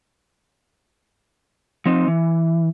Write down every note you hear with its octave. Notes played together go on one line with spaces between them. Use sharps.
F3 C4 D#4
E3